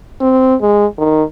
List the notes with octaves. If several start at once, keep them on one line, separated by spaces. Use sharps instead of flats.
C4
G#3
D#3